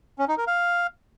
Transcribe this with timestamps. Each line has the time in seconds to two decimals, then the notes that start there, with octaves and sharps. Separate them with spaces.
0.19 C#4
0.28 D#4
0.38 A#4
0.47 F5